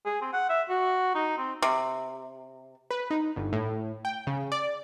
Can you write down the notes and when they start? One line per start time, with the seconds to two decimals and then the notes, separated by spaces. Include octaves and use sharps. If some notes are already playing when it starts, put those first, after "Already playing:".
0.05 G#4
0.22 C4
0.33 F#5
0.49 E5
0.69 F#4
1.15 D#4
1.38 C4
1.62 C3
2.90 B4
3.10 D#4
3.36 G1
3.53 A2
4.05 G5
4.27 C#3
4.52 D5